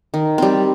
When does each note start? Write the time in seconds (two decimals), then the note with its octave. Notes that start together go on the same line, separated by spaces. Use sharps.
0.14 D#3
0.38 G3 C4